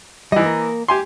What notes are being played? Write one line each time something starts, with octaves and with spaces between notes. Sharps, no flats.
E3 G3 D#4 D#5
A#3 A#4 A#5
G4 G#5 C6